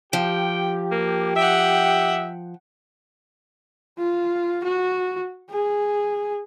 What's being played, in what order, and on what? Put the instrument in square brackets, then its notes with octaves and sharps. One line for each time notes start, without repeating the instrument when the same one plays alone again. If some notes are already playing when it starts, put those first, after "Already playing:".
[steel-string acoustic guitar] F3 [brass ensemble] G4 [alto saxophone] G5
[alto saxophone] A#3
[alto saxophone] E5 [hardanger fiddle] F#5 G5
[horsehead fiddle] F4
F#4
G#4